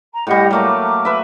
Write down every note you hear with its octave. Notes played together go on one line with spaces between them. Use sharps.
A#5
A2 G3 G4 D#5 F#5
F#3 A3 A#3 D6 F6
B4 E5